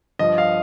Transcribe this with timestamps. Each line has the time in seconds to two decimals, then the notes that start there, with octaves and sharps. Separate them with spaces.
0.19 G2 F3 D#5
0.38 F5